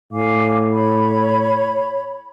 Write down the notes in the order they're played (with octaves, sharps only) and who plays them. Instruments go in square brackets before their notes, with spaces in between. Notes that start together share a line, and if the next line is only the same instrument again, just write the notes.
[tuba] A2 [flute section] F5 G#5 D6
[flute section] C#5 B5